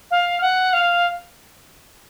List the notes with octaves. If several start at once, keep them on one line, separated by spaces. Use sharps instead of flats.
F5
F#5
F5